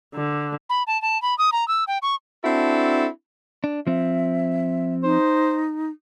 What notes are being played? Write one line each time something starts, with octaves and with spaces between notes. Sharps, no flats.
D3
B5
A5
A5
B5
D#6
A#5
E6
G5
C#6
C4 D4 E4 F#4 A4
D4
F3 C4 E5
D#4 C5